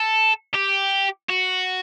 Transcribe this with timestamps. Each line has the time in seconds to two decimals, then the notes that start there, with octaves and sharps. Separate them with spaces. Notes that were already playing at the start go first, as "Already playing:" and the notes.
Already playing: A4
0.54 G4
1.30 F#4